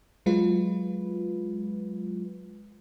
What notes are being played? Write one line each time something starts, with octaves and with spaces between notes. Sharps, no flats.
F#3 G#3 F4 B4